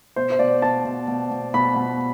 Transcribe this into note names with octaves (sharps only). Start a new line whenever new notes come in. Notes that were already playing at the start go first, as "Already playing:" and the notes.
B2 C5
C5
B2 D5
B2 A5
B2
B2
B2
B2 B5
B2